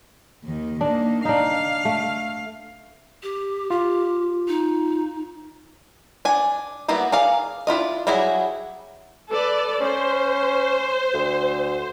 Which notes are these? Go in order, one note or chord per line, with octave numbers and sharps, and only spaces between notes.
D#2 D#3
D#3 A#3 D4
D4 D#4 F5
A3
G4
F4 G4
D#4
D4 G#5
G3 A#3 B3 E4 F#4
G#4 A#4 D5 F5
D4 E4 F4 D#5
F#3 G3 E4 F#4 G#4
A4 B4 D5
C#4 C5
D2